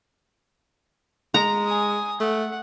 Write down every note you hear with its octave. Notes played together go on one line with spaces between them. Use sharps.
G#3 A#5
G#5 D#6
A3 F#5